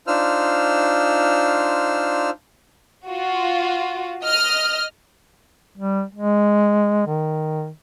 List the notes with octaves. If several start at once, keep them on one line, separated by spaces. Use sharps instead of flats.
D4 D#4 F4 C5 E6 F6
F4 F#4
D#5 F6
G3
G#3
D#3